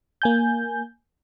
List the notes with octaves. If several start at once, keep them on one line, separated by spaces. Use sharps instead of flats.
A#3 G#5 G6